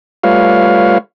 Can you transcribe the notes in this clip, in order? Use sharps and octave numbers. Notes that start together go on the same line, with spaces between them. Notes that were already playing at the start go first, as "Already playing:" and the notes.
G3 A3 F4 B4 C#5 F5